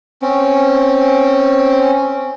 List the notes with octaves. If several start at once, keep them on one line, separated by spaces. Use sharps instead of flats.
C4 C#4